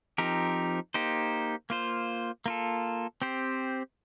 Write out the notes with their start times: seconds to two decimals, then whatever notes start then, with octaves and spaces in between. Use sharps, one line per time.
0.18 F3 C4 D#4 G4 A#4
0.94 A#3 D#4 G4 C5
1.70 A#3 F4 C5
2.46 A#3 F4 A4
3.22 C4 G4 C5